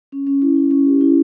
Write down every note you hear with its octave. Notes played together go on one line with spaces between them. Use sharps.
C#4
C#4
E4
E4
C#4
G4
E4